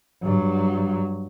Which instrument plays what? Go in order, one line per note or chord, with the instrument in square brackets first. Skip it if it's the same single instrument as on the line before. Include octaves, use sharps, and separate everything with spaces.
[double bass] G2 F#3